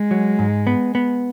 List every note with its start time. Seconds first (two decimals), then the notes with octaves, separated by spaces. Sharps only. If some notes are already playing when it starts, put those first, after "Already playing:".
Already playing: G#3
0.11 F#3
0.39 G#2
0.67 B3
0.95 B3